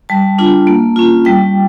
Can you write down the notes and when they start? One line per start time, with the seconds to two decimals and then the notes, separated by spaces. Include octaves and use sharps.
0.09 G3 A5
0.39 D4 F4
0.67 A#3
0.96 C#4 F4
1.25 G3 G5